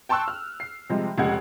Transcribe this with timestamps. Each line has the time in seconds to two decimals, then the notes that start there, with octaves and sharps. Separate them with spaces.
0.09 G5 A5 C6 C#6 E6 F#6
0.28 F6
0.60 C7
0.90 C3 F3 G3 G#3
1.18 F1 C#3 G#3 F#5 G#6